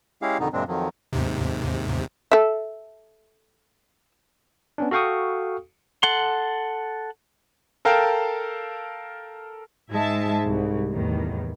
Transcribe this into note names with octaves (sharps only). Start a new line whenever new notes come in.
G#3 C#4 E4 G4 G#4 F5
F2 B2 D3 D#3 B3 D#4
F#2 A#2 C#3 G#3 C4 D4
F2 D#3 F3 F#3
D#2 G#2 C3
A4 E5
B3 C#4 D4
F#4 A4 F5 G5 C#6 D#6
A4 F#5 C6
A4 A#4 F5 G5 A5
G#2 G#3 E5 A5
C2
E2 A2 D#3